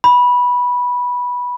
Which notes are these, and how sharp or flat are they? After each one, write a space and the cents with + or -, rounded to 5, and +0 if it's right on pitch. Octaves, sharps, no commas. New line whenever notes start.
B5 -10